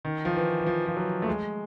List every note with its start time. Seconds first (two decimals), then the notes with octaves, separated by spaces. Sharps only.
0.05 D#3
0.25 F3
0.35 E3
0.59 E3
0.67 F3
0.86 F3
0.97 F#3
1.22 A3
1.28 G#3